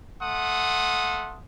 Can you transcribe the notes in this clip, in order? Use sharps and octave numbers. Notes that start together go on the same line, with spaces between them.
A3 F#5 C6 D#6